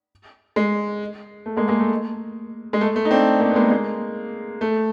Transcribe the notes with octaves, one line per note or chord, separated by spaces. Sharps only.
G#3
A3
G#3 A#3
G#3 A#3
A3
G#3
A3
A3
D#4
C4 D4
A#3 C4
B3
G#3 A#3
G#3 A#3
A3